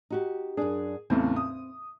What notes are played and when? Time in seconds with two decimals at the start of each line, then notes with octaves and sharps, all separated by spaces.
0.10 D#4 F#4 G4
0.57 F#2 D4 G#4
1.10 E2 A2 C#3 C4
1.36 D#6